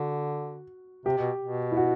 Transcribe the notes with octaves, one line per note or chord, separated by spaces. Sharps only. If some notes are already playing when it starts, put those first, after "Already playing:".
Already playing: D3 F#4
C3 G4
B2
B2
E4
F#4